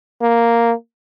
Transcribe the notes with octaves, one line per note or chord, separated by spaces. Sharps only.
A#3